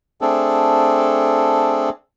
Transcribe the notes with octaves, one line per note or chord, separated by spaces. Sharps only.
A3 C4 D4 G#4 A4